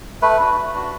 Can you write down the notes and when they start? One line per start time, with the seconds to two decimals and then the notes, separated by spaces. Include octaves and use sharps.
0.22 A3 B4
0.40 D4 F#4
0.57 A3
0.74 D4 F#4